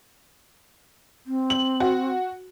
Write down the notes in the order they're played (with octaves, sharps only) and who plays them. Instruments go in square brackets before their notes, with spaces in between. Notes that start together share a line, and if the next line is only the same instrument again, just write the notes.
[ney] C4
[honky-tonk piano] F#7
F#4